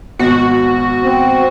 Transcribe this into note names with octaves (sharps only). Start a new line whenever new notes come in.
G#1 B2 F#4
C4